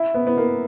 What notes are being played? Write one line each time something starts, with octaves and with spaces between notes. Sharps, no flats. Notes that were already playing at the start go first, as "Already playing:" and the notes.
Already playing: E4
B3
B3
A#3